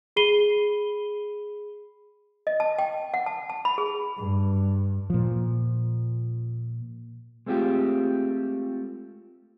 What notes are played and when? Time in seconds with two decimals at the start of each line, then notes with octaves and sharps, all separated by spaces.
0.16 G#4 B5 C7 D#7 G7
2.47 D#5
2.60 A5
2.79 G5
3.14 F#5
3.26 A5
3.50 A5
3.65 B5
3.78 G#4
4.18 G2
5.10 A#2 F3
7.46 G#3 A3 C4 F4 G4